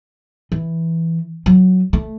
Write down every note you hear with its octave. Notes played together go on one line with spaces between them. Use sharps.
E3
F#3
A3